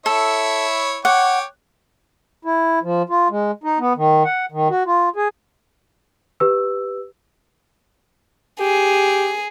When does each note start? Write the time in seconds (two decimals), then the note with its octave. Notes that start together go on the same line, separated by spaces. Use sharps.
0.06 E4 A4 C#5 E5
1.05 C#5 F#5 G5 D6
2.45 E4
2.83 F3
3.10 F4
3.30 G#3
3.64 D#4
3.79 B3
3.97 D#3
4.25 F#5
4.52 D#3
4.70 F#4
4.86 F4
5.16 G#4
6.40 G4 B4 E6
8.60 G4 G#4